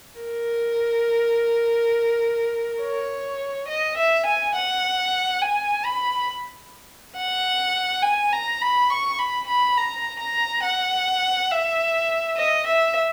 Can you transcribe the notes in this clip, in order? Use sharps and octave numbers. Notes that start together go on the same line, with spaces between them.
A#4
C#5
D#5
E5
G#5
F#5
G#5
B5
F#5
G#5
A#5
B5
C#6
B5
B5
A#5
A#5
F#5
E5
D#5
E5